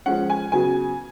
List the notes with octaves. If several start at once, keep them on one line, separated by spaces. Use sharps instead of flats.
F3 G#3 C#4 F#5
G#5
C#3 F#3 B3 G#5